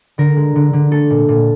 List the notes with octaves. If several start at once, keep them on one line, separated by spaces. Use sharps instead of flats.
D3 A#4
G#3
D3
D3
A3 A4
A#2
A#2